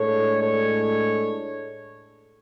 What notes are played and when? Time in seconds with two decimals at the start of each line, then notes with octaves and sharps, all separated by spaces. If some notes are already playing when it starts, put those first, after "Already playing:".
Already playing: A2 G#3 D4 A4 C#5
0.42 A4 C#5